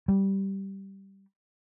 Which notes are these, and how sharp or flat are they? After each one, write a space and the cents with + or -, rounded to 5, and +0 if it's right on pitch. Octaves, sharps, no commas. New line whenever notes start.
G3 -10